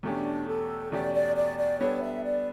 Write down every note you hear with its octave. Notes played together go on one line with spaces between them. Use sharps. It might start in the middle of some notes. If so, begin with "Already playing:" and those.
E2 B2 A3 C#4 D4 G4
A4
E2 B2 A3 C#4 G4 D5
D5
D5
D5
G3 B3 D4 A4 C#5
E5
D5